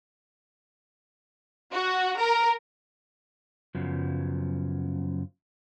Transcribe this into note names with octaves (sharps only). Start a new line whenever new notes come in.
F#4
A#4
F#2 C#3 F3 F#3 B3